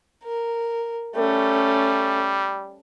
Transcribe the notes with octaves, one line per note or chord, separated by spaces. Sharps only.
A#4
G3 A3 C#4